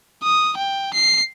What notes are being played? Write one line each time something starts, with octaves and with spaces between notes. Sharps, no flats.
D#6
G5
C7